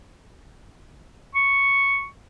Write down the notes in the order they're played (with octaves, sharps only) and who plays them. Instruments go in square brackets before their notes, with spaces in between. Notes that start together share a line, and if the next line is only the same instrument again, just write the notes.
[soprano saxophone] C#6